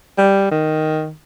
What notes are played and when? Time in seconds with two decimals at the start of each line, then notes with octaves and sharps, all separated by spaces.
0.18 G3
0.51 D#3